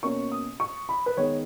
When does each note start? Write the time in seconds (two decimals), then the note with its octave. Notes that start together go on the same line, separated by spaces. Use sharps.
0.03 B2 A#3 C#4 C#6
0.32 D#6
0.60 C#6
0.89 B5
1.06 B4
1.17 D#3 G#3 B3 C#5